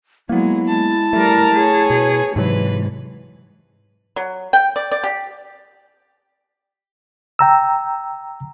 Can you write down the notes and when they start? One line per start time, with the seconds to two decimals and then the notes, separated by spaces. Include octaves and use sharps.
0.29 F#3 G#3 A#3 B3 E4
0.69 G#3 A5
1.13 G3 A3 A#4
1.53 G#4 C#5
1.90 B2 B4
2.36 G#2 C3 E3 F#3 G#3 B4
4.16 F#3
4.53 G5
4.76 D5
4.92 D5
5.03 G4
7.39 G5 A#5 E6